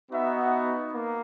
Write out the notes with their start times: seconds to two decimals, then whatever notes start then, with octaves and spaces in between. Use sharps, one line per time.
0.11 B3 D#4 F#4 E5
0.93 A#3